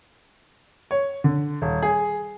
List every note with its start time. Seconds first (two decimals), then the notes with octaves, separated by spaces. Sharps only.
0.91 C#5
1.24 D3
1.62 D#1
1.82 G#4